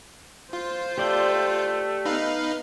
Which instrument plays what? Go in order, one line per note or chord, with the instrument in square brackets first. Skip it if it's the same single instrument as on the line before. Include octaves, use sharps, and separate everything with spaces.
[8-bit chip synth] F4 [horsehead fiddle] C5
[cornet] A3 [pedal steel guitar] G4 D5 G5
[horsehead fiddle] B3 [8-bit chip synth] D#4 B4 F5